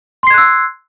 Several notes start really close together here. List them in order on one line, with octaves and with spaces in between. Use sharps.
C6 C7 G#6 F#6 E6